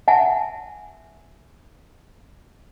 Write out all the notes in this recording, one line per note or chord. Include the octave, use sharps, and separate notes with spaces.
E5 F#5 G#5 A5